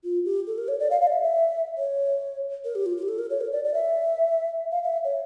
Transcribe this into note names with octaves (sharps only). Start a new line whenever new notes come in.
F4
G4
A4
A#4
C#5
D5
F5
F5
D5
E5
E5
C#5
A#4
G4
F4
F4
G4
A4
A#4
C#5
A#4
D5
D5
E5
F5
E5
C#5